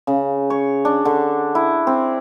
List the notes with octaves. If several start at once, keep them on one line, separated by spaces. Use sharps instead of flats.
C#3
C#5
D4
D3
E4
C4